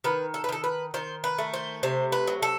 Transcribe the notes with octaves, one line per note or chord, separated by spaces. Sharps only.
D#3 B4
A4
B4
D#3 A4
B4
D#3 C5
B4
A3
C5
C3 C5
B4
F#3
A4